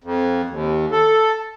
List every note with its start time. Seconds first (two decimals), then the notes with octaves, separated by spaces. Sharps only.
0.04 F2
0.50 D#2
0.91 A4